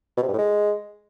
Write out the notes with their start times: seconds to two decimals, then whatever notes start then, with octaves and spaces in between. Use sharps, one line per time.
0.17 B2
0.23 C3
0.28 G2
0.33 A2
0.39 G#3